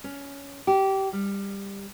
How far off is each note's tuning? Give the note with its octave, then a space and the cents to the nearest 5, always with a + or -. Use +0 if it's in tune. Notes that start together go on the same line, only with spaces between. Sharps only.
C#4 +15
G4 -20
G3 +20